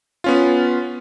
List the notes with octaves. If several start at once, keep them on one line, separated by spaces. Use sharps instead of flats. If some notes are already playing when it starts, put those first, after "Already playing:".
B3 C#4 F4